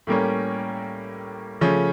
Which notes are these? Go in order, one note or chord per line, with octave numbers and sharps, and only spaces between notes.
A2 G3 A#3 C#4
C#3 F3 A3 C#4